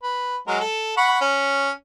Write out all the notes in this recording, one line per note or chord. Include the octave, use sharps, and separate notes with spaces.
B4
F#3 G#3 A#4
A4
F#5 B5 C#6
C#4